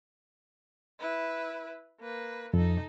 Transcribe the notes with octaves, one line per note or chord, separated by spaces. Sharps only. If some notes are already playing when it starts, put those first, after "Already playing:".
E4 B4
A#3 B4
F2 D#4 A4